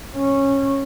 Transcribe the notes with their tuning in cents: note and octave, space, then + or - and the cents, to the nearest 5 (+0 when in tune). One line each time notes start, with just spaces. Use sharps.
C#4 -15